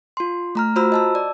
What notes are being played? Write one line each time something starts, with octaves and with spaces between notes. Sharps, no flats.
F4 C6
A3 A#5 F6
F4 F#4 C5 A#5 B5 E6
D#5 A5 E6
D5